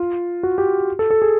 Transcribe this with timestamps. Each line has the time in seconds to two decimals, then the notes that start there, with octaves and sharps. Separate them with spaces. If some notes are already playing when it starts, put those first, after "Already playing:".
Already playing: F4
0.43 F#4
0.58 G4
0.99 A4
1.10 A4
1.22 G#4